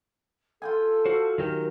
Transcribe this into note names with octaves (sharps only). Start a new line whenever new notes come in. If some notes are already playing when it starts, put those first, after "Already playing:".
F4 A4 G5 G#5
F#4 C5
D#3 F#3 G4 A#4